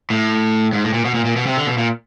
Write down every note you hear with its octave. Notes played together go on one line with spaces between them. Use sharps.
A2
G#2
A2
A#2
B2
A#2
A#2
B2
C3
D3
B2
A#2